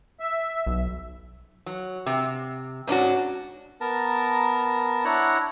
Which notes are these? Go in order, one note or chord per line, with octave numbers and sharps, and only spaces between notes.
E5
B1
F#3
C3
G#2 C#4 D4 F#4
B3 A#4 A5 A#5
D4 E4 C#5 F#5 A#5 F#6